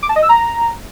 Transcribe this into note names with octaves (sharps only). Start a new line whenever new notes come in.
D6
A5
D#5
E6
A#5